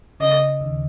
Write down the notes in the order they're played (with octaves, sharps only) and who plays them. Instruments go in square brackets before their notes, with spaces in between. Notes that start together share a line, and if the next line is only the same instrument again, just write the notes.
[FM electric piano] C#3 [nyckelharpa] D#5
[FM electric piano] D#2